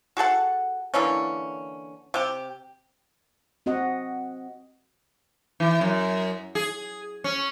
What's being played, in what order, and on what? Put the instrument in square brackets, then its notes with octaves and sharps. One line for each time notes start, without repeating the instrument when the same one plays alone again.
[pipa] F#4 G#4 A4 F#5
D3 E3 A#3 C#4
C3 G4
[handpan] C4 F#4 D#5 F#5
[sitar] E3
F#2
G#4
C#4